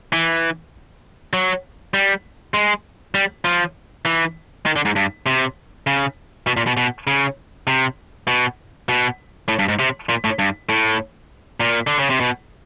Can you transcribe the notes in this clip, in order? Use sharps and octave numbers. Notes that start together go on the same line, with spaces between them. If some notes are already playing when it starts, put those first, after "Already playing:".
E3
F#3
G3
G#3
G3
F3
E3
D#3
D3
G#2
G2
C3
C#3
B2
A#2
B2
B2
C#3
C3
B2
B2
A2
G2
G#2
C3
A#2
A2
G2
A2
A#2
D3
C#3
C3
B2